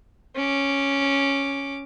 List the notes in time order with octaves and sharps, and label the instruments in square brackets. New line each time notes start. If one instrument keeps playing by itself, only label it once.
[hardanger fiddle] C#4 D6